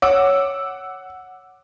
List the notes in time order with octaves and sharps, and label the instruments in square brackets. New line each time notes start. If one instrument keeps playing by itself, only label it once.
[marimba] C#5 [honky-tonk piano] F#5 D6 E6